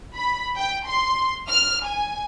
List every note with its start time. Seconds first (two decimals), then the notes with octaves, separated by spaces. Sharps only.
0.16 B5
0.56 G5
0.87 C6
1.48 F6
1.84 G#5